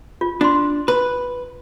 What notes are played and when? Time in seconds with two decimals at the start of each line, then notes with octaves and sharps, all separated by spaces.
0.21 F4
0.41 D4 F4 C6
0.88 B4